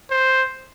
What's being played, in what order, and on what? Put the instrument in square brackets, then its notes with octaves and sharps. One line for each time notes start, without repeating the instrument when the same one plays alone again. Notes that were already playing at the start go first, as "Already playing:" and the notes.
[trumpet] C5